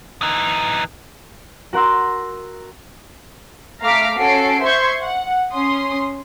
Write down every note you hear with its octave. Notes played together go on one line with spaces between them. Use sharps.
E3 D#4
F#4 A#4 F#5 C6 E6
A3 F5 A#5 D6 F6 B6
C#4 F#4 A4 C7 D7
C5 E5 C6 C#6 G6 G#6
F#5
C#4 C6 D#6